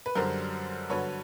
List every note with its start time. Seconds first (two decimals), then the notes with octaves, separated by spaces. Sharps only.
0.06 B4
0.16 F#2 D3 G3 A#4 C5
0.90 G2 D3 F#3 B4 C#5